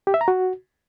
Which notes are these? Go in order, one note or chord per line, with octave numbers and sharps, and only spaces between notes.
G4
E5
A#5
F#4